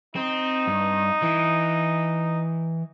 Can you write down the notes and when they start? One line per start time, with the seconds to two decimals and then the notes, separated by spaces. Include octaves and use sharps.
0.16 C4 D#4
0.67 G2
1.22 E3